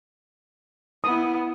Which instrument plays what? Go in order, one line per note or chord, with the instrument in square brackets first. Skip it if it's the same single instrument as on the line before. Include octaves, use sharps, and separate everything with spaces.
[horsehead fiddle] B3 E4 [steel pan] D#6